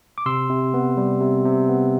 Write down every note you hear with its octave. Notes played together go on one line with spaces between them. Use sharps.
D6
C3 C6 E6
C3
B3
G3
C3
C3
B3